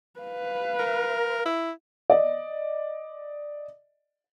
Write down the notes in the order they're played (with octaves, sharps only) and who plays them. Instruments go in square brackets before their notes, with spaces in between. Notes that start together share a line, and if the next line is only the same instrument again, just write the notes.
[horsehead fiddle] B4 F5
[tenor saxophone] A#4
E4
[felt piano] D5 D#5